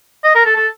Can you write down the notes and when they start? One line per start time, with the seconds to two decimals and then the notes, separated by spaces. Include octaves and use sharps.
0.24 D#5
0.35 A#4
0.46 A4
0.56 A4